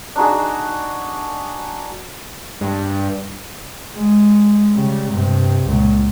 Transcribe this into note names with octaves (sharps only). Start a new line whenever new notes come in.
D4 D#4 F#4 G#4
G2
G#3
C#3 G3
G2 C3
C#2 A#2